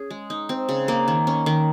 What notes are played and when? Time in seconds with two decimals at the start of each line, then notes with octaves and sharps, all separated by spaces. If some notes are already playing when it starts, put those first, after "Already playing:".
Already playing: C#4 G#4
0.10 G#3
0.30 D#4
0.49 C4
0.69 C#3
0.88 A#3
1.08 D#3
1.27 C#4
1.46 D#3